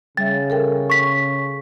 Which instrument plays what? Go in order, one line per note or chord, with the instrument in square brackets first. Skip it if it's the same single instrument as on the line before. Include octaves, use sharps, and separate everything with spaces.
[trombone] C#3 [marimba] G3 E5 [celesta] A6
[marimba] A4 A#4 G5
[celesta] C#6 B6